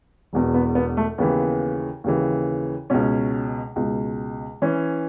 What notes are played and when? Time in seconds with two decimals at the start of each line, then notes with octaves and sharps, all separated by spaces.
0.33 E1 E2 B2
0.54 B3
0.75 B3
0.97 A3
1.18 D#2 C#3 E3 B3
2.04 D#2 C#3 E3
2.90 C#2 B2 C#4
3.76 C#2 B2
4.62 E3 C#4